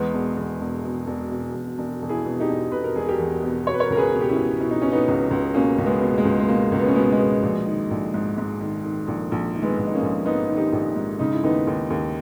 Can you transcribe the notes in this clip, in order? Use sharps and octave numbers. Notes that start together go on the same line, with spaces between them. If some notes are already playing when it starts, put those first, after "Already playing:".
Already playing: E2 G#3 B3
E1
E2
E1
B2
E1
B2
E1
E1
E1
E4 G#4
B2
D#4 G4
E1
B2 B4
A#4
E1 G#4
G4 A#4
E2
B2
B2 C#5
B4
A#4 C#5
C#2 A#4
G#4 B4
B2
G4
C#4 E4
B2
B2 E4
D#4
B2 C#4
B3 D#4
C#2
C#2
B2 A#3 C#4
C#2
G#3 B3
B2
A#3
G#3
C#2
G#3
B2 A#3
C#2
B3
C#4
B2 G#3 B3
G#3 B3
B2
A#1
D#3
A#1
G#2
G#2
D#3
D#3
A#1
A#1
D#3
G#3 B3
A#1
D#4
A#3 C#4
A#1
G#2 B3 D#4
D#3
D#4 G4
A#1
G#2
C#3 D#4
E4
D#2 B3 D#4
D#2
D#2